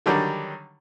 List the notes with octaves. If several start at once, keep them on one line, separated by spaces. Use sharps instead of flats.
D3 D#3 F#3 G3